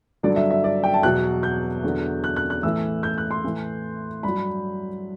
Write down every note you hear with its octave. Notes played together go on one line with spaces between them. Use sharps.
G2 D3 F#3 D5
E5
E5
D5
G5
A5
E2 B2 F#3 F#6
G6
E2 D3 F#3
F#6
F#6
F#6
A2 E3 E6
G6
F#6
C6
A2 E3
G2 F#3 B5